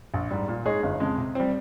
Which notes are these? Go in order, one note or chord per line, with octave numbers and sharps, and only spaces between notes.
A#1
G#2 G3
A#2
G#3 D#4 G#4 C#5
G1
F2 C#3 G#3
C3
G3 C4